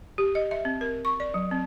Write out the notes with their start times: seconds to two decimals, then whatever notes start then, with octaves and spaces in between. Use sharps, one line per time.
0.18 G4
0.35 D#5
0.51 E5
0.65 C4
0.81 A#4
1.05 C#6
1.20 D5
1.34 F#3
1.51 C4